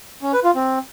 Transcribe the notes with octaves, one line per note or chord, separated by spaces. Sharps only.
C#4
B4
F4
C4